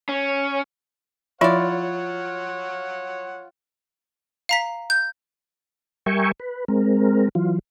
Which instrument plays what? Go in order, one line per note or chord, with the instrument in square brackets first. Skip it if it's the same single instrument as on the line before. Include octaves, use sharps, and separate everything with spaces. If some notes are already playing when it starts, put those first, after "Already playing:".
[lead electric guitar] C#4
[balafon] F3 [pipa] E4 D5 [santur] F4 [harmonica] C#5 F#5
[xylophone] F5 A#5 B6
G6
[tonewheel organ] G3 A#4 E5 G5 G#5 C#6
B4
G#3 C4 A#4
E3 F#3 F4